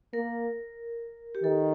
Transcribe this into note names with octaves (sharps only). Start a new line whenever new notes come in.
A#3 A#4
G4
D#3 A4